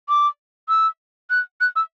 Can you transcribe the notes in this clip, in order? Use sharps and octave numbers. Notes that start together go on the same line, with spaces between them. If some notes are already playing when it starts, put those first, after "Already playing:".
D6
E6
F#6
F#6
E6